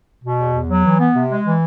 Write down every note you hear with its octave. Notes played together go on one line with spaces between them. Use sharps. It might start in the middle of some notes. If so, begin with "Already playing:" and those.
B2
E2
E2
F#3
E3
B3
C3
G#3
E3